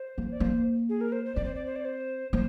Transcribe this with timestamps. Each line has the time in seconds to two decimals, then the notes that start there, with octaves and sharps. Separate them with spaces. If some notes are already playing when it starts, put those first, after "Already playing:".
Already playing: C5
0.18 A#3
0.32 D5
0.40 A#3 C5
0.89 G#4
1.01 A#4
1.12 C5
1.25 C5
1.35 C4 D5
1.44 C5
1.55 D5
1.66 C5
1.76 D5
1.85 C5
2.33 A#3 C5